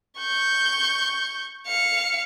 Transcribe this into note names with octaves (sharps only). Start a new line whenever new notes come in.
C#6 G6
F5 C#7